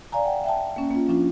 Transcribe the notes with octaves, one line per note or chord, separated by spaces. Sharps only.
D5 F5 G#5 A#5
F#5 G5
E5 G5 A5
A#3 C#4
A#3 C#4 F4
F3 C#4 D4 F4